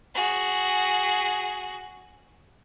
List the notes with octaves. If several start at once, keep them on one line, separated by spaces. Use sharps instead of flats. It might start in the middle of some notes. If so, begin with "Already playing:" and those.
F#4 G#4